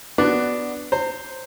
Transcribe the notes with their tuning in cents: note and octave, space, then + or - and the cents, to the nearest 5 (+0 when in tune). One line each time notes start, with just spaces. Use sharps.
B3 +0 D4 +0 F#4 +10
C5 +0 A#5 -35